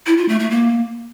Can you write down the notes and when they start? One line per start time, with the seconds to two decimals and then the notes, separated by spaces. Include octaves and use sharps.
0.06 E4
0.17 F4
0.29 A3
0.40 A3
0.51 A#3